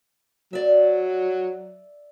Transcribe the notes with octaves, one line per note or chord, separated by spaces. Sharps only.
F#3 D5 E5